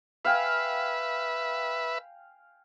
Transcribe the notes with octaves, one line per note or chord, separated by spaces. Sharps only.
B4 E5 F5 G5 G#5